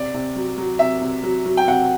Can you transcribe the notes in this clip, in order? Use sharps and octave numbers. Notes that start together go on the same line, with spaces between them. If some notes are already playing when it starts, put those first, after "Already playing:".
Already playing: C3 D5
C3
F#3
F#3
C3 E5
C3
F#3
F#3
G5
C3 F#5